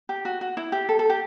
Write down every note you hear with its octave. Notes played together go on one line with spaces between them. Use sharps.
G4
F#4
F#4
E4
G4
A4
A4
G4